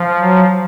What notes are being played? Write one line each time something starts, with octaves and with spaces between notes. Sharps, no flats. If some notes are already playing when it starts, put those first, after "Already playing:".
Already playing: F3
F#3